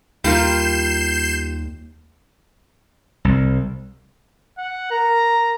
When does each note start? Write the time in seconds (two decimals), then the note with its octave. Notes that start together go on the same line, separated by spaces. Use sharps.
0.24 D#2 G3 F4 A#4 G6 C7 E7
3.25 C2
4.58 F#5
4.91 A#4 A#5